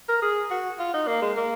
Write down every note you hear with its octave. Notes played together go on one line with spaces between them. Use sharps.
A#4
G#4
F#4
F4
D#4
A#3
G#3
A#3